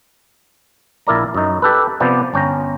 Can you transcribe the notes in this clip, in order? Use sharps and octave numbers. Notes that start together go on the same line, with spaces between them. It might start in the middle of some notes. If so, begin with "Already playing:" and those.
A#1 E4 A#4 D5 A#5
F#2 D#4
G4 A4 B4
C3 F3 B3 G4 D5
G1 C#4 G5 A#5